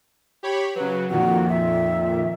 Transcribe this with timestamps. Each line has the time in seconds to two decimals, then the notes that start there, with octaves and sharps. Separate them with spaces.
0.43 G4 C#5 B5
0.75 C#3 F#3 B4
1.10 F2 A#2 D#3 F#4
1.49 E5